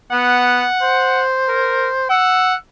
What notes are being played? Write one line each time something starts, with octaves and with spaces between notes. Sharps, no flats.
B3 F#5
C5
A#4
F#5 E6